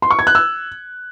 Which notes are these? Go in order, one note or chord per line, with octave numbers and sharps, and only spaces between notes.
C6
C#6
G#6
F#6
E6